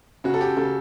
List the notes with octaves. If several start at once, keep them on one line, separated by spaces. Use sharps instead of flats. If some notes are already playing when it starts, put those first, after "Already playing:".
C#3 F#4
A4
G4
C#3 A4